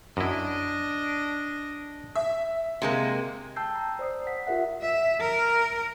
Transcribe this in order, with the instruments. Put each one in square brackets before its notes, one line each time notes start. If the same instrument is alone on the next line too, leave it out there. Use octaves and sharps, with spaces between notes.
[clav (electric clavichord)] F#2 E4 [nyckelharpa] D4 D#5
[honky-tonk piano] E5
[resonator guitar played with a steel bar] C3 G#3 A#3
[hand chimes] G5 A5 E6 G6 C7
A#5
C5 D5 D#6 C7
F#5 B6
F4 G4 A#4 E5 F#5
[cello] E5
A#4